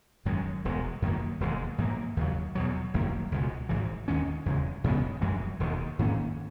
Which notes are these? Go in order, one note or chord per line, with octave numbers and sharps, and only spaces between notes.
G#1 F#2 D#3 G#3
E1 E2 D#3 G#3
F#2 D#3 A#3
E1 D#2 C#3 G#3
G#2 E3 A#3
D#2 C#3 F#3
E2 B2 F#3
F#1 F#2 D#3 A#3
C#2 B2 G#3
G#1 G#2 E3
D#2 D#3 G#3 C#4
E2 C#3 G#3
F#2 C#3 G#3 B3
F#2 E3 G#3
E1 D#2 D#3
G#2 D#3 A#3 C#4